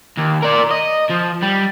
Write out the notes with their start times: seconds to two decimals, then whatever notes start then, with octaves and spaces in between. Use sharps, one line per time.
0.17 D#2
0.42 A#4 D5
0.71 D#5
1.09 F3
1.43 G3